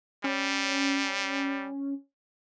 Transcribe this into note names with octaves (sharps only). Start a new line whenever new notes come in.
G3 C#4